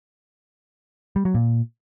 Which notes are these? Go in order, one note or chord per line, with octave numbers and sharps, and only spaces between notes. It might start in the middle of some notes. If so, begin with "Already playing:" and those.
G3
F#3
A#2